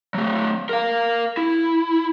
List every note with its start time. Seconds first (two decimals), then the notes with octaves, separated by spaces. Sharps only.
0.14 F#3 A3
0.69 A#4 F5
1.37 E4